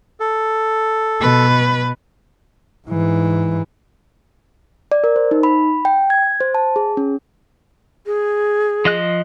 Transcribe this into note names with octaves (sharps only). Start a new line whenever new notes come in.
A4
B2 B4
G#2 E3
D5
A#4
C5
D#4
B5
G5
G#6
C5
A5
G#4
C#4
G#4
F3 D#5 F#6